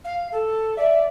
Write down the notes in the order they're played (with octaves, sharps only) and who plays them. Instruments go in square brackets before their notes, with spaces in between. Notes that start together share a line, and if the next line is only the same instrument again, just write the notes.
[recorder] F5
A4
[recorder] D5 [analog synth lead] E5